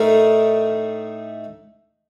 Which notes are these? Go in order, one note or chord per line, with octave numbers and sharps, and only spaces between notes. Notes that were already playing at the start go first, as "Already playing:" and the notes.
Already playing: A2 A3 D#4 A#4